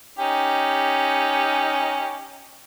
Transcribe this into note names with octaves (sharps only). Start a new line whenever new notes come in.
C#4 D#4 G4